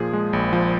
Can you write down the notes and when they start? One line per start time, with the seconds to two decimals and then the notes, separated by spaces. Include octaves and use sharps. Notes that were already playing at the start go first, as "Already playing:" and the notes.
Already playing: A#2 F3 G#4
0.13 G#3
0.33 A#1
0.53 F3